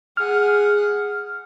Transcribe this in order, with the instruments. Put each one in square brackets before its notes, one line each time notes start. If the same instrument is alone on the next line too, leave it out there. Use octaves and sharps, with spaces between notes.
[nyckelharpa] G#4 F#5 [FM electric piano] F6